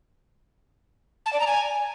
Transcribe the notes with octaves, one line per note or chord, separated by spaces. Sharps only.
A5
D5
A#5
G#5